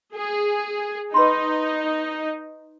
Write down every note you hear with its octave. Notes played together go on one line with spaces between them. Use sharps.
G#4
D#4 B4 B5 C6